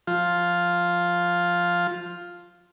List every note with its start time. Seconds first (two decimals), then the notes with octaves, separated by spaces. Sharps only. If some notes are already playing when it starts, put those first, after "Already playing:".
0.07 F3 F4